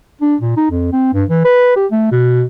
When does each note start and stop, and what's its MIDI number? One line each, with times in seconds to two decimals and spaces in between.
0.21 0.36 62
0.41 0.54 46
0.57 0.67 63
0.71 0.90 41
0.93 1.12 60
1.14 1.24 43
1.29 1.42 52
1.44 1.76 71
1.76 1.86 67
1.91 2.09 57
2.11 2.44 47